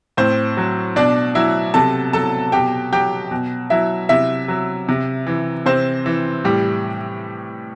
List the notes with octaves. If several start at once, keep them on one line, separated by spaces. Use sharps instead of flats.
A2 C4 C5
F#3
B2 D4 D5
F#3 E4 E5
C3 A4 A5
F#3 A4 A5
B2 G4 G5
F#3 G4 G5
B2
F#3 E4 E5
C3 E4 E5
F#3
C3
E3
C3 C4 C5
E3
A2 G3 G4